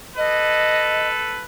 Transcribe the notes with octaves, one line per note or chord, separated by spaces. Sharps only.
A4 B4 D#5